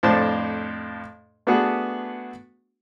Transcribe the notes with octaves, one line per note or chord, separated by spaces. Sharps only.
F2 A2 D4 C5 A5
A3 B3 D4 F#4 G#4 B4